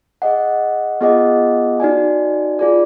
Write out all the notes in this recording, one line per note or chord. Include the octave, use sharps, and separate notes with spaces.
G#4 D#5 F#5
B3 F4 G#4 D#5 F#5
D#4 F#4 D5 G#5
F4 G#4 D5